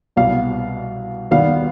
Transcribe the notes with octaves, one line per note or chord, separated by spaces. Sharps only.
C2 B2 B3 F5
D#2 D#3 G3 B3 F5